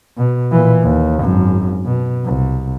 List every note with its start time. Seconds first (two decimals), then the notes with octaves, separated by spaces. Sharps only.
0.18 B2
0.52 A#2 E3
0.82 D#2
1.21 G#1 F#2
1.85 B2
2.26 C2